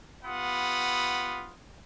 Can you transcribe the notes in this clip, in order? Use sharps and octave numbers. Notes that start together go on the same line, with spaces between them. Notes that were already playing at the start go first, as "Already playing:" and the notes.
B3 F4 G4 F#5 B5 D#6